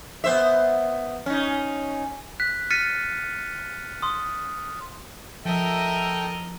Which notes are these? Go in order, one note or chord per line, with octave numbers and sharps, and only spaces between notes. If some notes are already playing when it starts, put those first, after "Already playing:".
B3 C5 E5
C#4 D#4
F#6 B6
F6 A6 B6 C#7 D#7
C6 D#6
F3 A4 A#4 D#5 E5 G5